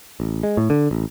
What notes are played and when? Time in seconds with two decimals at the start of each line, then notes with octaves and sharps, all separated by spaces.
0.20 A1
0.43 G#3
0.57 A2
0.70 D3
0.91 A1